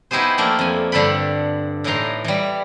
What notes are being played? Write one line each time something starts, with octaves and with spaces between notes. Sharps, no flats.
B3 D#4 E4 G4 G#4 C5
F3 A3 A#3 D4 E4 F4
F2 G#5
G2 D3 A4 G5 B5
A2 E3 D4 D#4 A#5 C6
E3 G3